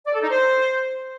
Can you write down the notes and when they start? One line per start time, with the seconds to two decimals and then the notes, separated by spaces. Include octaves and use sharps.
0.06 D5
0.14 A4
0.22 D#4
0.31 C5